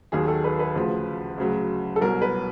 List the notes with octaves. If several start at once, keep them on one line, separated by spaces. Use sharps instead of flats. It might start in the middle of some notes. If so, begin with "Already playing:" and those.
D#2 D#3 F#3 G#4
A4
B4
B4
D2 C#3 F3
D2 C#3 F#3
A4
C2 B2 F#3 A#4
B4